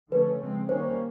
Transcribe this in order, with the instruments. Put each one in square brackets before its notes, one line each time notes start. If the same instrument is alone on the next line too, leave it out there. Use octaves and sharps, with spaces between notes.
[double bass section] D3 F3 A3 C#4 [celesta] B4
[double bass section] C#3 F3 G#3 C4
[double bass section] D#3 G3 A#3 C#4 [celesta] C5